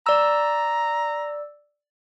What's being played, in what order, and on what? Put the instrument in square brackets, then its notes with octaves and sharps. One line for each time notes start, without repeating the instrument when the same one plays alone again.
[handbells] D5 E6 [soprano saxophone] A#5